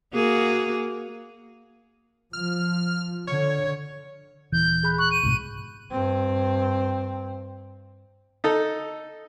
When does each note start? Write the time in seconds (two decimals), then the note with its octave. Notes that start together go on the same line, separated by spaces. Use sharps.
0.14 A#3 F#4 G#4
2.33 F3 F6
3.27 D3 C#5
4.52 D#1 E3 G6
4.83 G#4 B5 F#6
4.98 C#6 F#6
5.11 D#7
5.23 C2 G#2 B2
5.92 G2 C4
8.44 D#4 A4